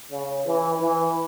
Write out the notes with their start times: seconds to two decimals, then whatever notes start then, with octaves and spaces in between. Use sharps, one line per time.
0.11 C#3
0.46 E3
0.80 E3